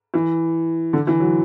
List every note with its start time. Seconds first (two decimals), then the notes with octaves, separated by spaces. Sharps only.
0.14 E3
0.93 D3
1.07 E3
1.20 F#3